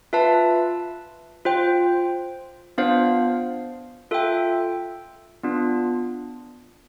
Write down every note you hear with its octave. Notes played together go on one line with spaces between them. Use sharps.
F4 B4 E5 A5
F4 C5 G5
B3 D4 F4 C5 F5
F4 A4 E5 G5
B3 D4 F4